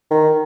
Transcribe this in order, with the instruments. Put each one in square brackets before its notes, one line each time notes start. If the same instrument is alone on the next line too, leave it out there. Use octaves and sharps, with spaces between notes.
[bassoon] D#3